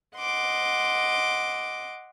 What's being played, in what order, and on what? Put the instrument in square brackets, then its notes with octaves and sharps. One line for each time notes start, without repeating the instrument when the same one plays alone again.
[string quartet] D#5 F#5 C6 D6